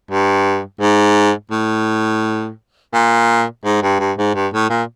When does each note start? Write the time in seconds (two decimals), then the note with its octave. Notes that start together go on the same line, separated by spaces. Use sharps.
0.11 G2
0.81 G#2
1.51 A2
2.94 A#2
3.65 G#2
3.82 G2
4.00 G2
4.18 G#2
4.35 G2
4.53 A2
4.70 A#2